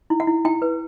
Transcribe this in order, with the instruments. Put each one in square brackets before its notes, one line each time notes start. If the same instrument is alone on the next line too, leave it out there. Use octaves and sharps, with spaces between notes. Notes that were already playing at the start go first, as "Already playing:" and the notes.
[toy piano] E4
F#5
E4
E4 G5
B4